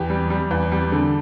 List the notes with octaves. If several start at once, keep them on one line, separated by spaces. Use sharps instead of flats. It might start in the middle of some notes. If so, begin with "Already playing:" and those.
Already playing: E2 G4
G3
G3
E2
G3
D3